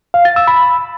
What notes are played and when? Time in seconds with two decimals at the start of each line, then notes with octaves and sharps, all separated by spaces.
0.14 F5
0.25 A6
0.36 E6
0.47 B5